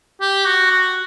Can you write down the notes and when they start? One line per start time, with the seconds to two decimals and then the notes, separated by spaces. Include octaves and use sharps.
0.21 G4
0.46 F#4
0.71 F#4